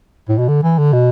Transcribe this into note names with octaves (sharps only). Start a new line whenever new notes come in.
A2
B2
D3
E3
D3
B2